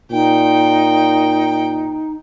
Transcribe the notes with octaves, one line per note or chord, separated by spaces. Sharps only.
A#2 D#4 G5